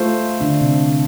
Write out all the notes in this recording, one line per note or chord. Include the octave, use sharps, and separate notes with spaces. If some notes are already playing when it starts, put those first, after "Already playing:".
Already playing: A3 F4 C5
D3 D4
C3 C4